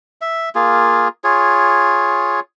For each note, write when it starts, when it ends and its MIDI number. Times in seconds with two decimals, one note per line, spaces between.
0.21 0.49 76
0.55 1.08 58
0.55 1.08 65
0.55 1.08 68
1.24 2.40 65
1.24 2.40 68
1.24 2.40 73